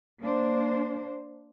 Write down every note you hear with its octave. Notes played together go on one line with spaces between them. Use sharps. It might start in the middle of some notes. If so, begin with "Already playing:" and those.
A#3 D4 C5